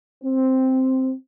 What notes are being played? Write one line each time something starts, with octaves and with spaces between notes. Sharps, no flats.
C4